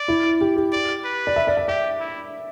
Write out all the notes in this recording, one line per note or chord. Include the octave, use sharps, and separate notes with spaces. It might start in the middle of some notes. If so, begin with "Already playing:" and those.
Already playing: D5
E4
G4
G4
D5
B4
D5
E5
D5
E5
G4 E5
E4